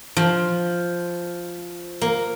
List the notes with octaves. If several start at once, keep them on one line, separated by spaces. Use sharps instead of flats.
F3
A#3